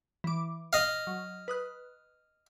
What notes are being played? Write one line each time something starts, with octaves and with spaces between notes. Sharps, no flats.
E3 D6
D#5 F5
F#3
B4 D#6 F#6